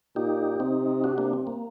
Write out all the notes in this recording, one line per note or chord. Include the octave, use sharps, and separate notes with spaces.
A#2 D#4 G4
C3 C4 D#4
D4 F#4
A#3 D4
C4
A#3